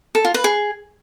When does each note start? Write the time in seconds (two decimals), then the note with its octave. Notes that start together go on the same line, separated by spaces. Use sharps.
0.15 A4
0.25 F4
0.34 B4
0.44 G#4